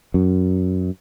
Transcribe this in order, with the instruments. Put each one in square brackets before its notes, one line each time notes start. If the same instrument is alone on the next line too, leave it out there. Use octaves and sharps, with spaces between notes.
[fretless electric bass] F#2